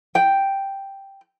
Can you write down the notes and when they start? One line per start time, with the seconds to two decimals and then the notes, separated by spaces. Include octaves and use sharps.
0.15 G5